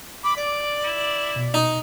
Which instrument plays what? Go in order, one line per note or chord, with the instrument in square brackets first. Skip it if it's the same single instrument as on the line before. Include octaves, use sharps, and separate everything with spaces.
[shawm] B5 [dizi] D6
[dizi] D5 [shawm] D6
[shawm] E4
[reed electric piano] B2
[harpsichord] D#4